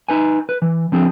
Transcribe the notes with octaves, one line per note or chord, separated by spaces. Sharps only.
D#4 B4 G#5
B4
E3
F3 C4 D4 G#4